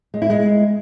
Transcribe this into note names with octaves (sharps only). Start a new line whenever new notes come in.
G#3
E4
G#3